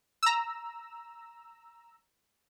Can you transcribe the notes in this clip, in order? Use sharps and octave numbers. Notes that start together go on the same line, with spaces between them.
A#5 E6